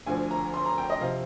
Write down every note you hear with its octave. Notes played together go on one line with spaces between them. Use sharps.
D2 D3 F3 G#5
A#5
C6
A#5
G5
D#5
C3 F3 F5